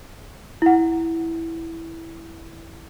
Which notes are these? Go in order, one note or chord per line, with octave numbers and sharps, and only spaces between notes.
E4 F#5